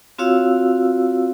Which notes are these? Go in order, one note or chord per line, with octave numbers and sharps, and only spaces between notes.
C4 F4 F#4 C#5 F5 E6